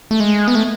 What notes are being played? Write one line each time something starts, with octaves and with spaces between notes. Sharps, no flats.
A3
G#3
B3
A3